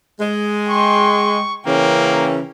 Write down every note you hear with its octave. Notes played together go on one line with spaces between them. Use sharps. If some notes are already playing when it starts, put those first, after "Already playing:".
G#3
G5 C6 C#6
C#3 E3 A#3 C#4 A#4 G5